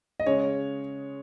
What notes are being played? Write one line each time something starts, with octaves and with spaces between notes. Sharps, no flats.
D#5
C#3 G#3 C#4 C#5